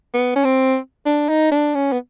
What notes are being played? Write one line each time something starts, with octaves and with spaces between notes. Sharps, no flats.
B3
C#4
C4
D4
D#4
D4
C#4
B3